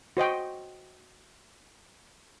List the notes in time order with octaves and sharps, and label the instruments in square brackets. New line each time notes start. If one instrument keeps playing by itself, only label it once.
[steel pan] F#4 C5 D#5 G5